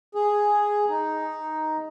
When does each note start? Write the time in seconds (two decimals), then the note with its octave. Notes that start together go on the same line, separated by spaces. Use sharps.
0.15 G#4
0.89 D#4